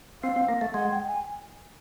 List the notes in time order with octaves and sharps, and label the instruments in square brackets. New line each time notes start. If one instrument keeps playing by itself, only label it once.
[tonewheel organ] C4 [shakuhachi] F5
[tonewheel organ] C4
A#3
A3
[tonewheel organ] G#3 [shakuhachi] F#5
[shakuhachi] G5
G#5